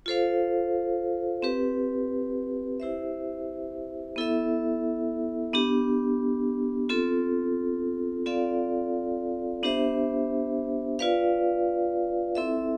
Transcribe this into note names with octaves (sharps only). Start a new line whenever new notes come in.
F4 A4 C5 F5
C4 G4 B4
E4 G4 C5 E5
B3 E4 A4 E5
B3 D4 G4
C4 F4 A4
C4 F4 A4 D5 F5
B3 D4 G4 C5 E5
F4 B4 D5 F5
C4 E4 A4 E5